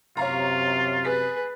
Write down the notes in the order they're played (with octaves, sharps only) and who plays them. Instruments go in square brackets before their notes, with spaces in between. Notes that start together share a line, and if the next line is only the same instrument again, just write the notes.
[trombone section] F#2 C3 [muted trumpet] F4 [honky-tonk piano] C#5 F5 A#5
[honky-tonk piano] G#4 A6 B6 [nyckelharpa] B4